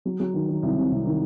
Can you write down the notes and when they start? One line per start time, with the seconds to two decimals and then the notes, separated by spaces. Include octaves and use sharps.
0.05 F#3
0.20 F#3
0.34 D#3
0.49 D#3
0.63 C2
0.77 C3
0.91 C2
1.05 D#3